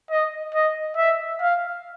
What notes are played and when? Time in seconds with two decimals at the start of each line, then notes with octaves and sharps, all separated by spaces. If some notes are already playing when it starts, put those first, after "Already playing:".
0.10 D#5
0.54 D#5
0.97 E5
1.40 F5